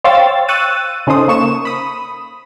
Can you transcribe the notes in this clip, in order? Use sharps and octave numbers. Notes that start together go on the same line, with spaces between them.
C5 C#5 F5 G5 E6 A6
C#6 E6 F#6 A6 D#7
C#3 C#4 D#4 A4 C5 D#6
A#3 C#6 E7
B5 D#6